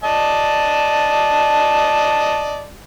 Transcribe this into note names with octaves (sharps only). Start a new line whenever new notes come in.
D5 D#5 A5